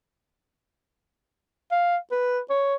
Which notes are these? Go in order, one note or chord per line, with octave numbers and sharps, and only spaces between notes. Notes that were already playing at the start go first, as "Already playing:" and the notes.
F5
B4
C#5